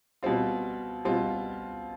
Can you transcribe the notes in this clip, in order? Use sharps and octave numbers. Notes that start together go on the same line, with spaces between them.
B2 G3 C4 F4
B2 G3 C4 F4